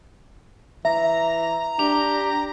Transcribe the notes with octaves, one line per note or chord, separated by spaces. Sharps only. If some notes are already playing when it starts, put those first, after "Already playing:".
E3 E5 A#5
D4 G4 F7